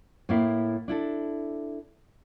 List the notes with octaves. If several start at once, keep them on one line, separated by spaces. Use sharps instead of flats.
A2 A#3 E4
D4 E4 A4